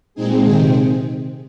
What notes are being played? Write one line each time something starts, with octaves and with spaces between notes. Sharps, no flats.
A#2 G#3 C4 D#4 G#4
C3 D#3 C4 D#4 G#4